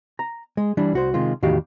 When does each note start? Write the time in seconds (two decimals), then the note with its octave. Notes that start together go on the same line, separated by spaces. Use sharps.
0.19 A#5
0.57 G#3
0.77 E3 G3 D4
0.93 C2 F#4 C5
1.14 C3 D#3 G#3 F4
1.42 E2 A2 D#3 F#4 G4 F5